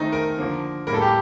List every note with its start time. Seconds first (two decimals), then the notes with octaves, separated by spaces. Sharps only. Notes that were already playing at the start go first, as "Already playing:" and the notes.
Already playing: D#3 A3 C4 D#4
0.12 A#4
0.37 D3 F3 A#3
0.87 A2 G3 A#3 A#4
0.94 A4
1.01 G4